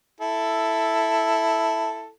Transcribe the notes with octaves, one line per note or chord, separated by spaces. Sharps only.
E4 A4